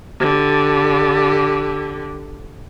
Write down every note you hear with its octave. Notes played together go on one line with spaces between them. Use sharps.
D3 G4